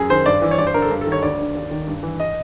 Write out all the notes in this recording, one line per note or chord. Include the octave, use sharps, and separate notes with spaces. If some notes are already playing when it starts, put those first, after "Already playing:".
Already playing: F#2 G#4
D#3 C5
G2 D5
E3
C#5
G2 D5
C5
D3 A#4
A4
G2
A4
D#3
C#5
D2 D5
D3
D#2
D#3
G2
E3
D#5